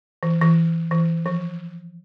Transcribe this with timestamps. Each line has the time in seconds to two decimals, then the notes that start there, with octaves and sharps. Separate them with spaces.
0.23 E3
0.42 E3
0.91 E3
1.26 F3